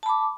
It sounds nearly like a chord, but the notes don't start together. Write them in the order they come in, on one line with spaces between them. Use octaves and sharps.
A5 B5 D6